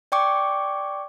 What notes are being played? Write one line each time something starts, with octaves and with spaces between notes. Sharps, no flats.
D5 G5 C#6 D6